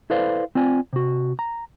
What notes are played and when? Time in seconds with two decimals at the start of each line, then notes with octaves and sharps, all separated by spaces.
0.10 E4 A4 B4 C5 D5 F5
0.55 C4 F4 D5 G#5
0.93 C3 F#4
1.39 A#5